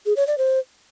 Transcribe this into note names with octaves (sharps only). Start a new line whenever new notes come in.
G#4
C#5
D5
C5